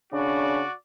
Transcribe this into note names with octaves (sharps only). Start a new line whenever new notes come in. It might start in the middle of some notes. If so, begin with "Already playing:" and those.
C#3 D4 F#4 D5